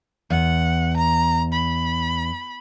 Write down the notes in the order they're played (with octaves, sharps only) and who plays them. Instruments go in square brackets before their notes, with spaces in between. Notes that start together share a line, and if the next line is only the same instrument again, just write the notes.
[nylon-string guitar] E2 [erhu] F#5
[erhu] A#5
B5